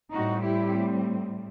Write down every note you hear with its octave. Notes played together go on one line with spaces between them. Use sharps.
A2 G3 C4 D#4 F#4
E4 G4